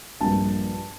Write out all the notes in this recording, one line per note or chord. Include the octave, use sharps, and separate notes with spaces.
A#1 G2 A5